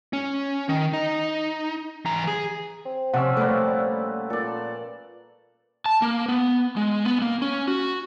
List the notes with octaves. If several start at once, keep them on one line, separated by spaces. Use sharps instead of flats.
C#4
D#3
D#4
E3 A#5
G#4
C4
C3 F3 C#4 F#5 E6
A#2 G3 A3 B4
A#2 A4 D5
A5
A#3
B3
G#3
B3
A#3
C#4
F#4